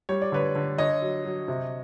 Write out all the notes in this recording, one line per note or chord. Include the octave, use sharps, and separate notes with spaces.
G3 C#5
D5
D3 B4 C#5
D3
D3 C#5 D#5
F#3
F#3
C3